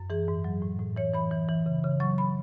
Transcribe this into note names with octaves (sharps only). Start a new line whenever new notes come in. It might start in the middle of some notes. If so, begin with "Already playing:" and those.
Already playing: F#2
E3 G#4
G#2
F#3
A2
A2
E3 C#5
E3 B5
E3
E3
C#3
C#3
F#3 C#6
B5